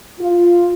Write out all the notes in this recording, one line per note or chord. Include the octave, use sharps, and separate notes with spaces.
F4